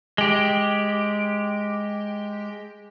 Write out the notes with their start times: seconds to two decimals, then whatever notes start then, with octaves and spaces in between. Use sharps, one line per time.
0.18 G#3 G4